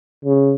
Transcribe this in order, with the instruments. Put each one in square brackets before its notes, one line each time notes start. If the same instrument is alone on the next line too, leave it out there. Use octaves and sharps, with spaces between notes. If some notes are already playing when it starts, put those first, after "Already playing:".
[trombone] C#3